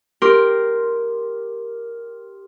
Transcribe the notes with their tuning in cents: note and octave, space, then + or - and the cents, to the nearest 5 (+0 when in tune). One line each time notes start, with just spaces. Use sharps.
G4 +0 A#4 +0 C6 +0